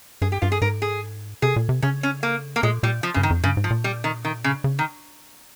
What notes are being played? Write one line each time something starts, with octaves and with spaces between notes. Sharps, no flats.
G2 G#4
G4
G2 F4
G#4
G#2 A#4
G#4
C3 G#4
A#2
C3
C#3 C#4
C#4
A#3
A#3
A#2 G#3
A#2 G3
F3
G2 C#3
D#3
F2
G2 C#3
G#2
F3
A#2
G3
D#3
D#3
C#3
C#3
D#3